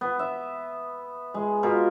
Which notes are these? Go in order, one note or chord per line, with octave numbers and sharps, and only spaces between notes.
B3
E5
G#3
B2 F4 A#4